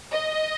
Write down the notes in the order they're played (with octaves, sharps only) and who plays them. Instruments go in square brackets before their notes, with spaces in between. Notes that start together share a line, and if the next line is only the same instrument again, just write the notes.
[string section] D#5